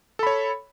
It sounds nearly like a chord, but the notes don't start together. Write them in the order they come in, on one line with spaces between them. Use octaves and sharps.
A4 B5 C#5